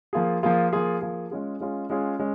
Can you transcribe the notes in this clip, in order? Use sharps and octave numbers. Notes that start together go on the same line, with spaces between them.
F3 A#3 F4 G#4
F3 A#3 F4 G#4
F3 A#3 F4 G#4
F3 A#3 F4 G#4
G#3 C#4 F4 G#4
G#3 C#4 F4 G#4
G#3 C#4 F4 G#4
G#3 C#4